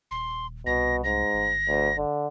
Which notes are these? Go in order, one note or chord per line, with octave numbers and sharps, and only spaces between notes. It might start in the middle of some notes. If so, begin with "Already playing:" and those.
D#1 C6
C2 B2 A#6
G#2 A#6
G1
D2
D3